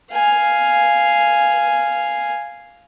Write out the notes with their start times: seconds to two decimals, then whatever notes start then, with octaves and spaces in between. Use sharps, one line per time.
0.11 F5 G#5